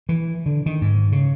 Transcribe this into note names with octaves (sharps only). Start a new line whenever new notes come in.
E3
D3
D#3
G#2
C#3